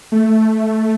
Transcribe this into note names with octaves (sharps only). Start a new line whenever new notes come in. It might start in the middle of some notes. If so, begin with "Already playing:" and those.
A3